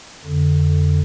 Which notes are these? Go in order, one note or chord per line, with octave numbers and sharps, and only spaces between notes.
F2 D3